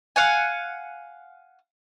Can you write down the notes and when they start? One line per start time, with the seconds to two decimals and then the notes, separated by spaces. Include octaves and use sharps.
0.16 F5 F#5 G#5